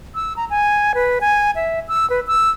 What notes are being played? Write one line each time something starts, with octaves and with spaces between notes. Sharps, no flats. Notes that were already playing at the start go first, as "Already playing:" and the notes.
E6
A#5
G#5
B4
G#5
E5
E6
B4
E6